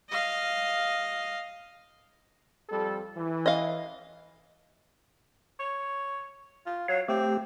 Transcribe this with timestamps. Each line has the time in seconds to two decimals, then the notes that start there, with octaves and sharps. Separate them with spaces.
0.10 D#5 F5
2.70 F2 G3 A4
3.17 E3
3.46 D#5 F5
5.60 C#5
6.66 F4
6.88 F#3 C#5 F5
7.09 A3 C4 G4